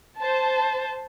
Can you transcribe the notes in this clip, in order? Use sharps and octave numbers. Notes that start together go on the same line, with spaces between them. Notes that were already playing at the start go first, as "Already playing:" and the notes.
C5 A5